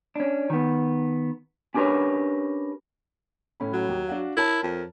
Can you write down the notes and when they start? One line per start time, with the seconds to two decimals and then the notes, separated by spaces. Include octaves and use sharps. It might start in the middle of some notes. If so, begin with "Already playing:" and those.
0.16 C#4 D4
0.50 D#3 B3
1.74 C#4 D4 G4 A#4 B4 C#5
3.60 A2 C#4 B5
3.73 F#3
3.89 D#2
4.07 D4 F#4 F5
4.37 E4 A#4 C#5 A5
4.63 F2